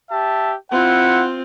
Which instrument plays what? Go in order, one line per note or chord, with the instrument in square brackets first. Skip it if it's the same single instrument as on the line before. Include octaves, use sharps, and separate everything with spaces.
[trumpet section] G4 E5 A5
[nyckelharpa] C4 F4 [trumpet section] E4 F#5